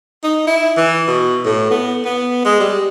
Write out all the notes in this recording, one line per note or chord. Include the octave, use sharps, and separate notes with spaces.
D#4
E4
E3
B2
A2
B3
B3
G#3
G3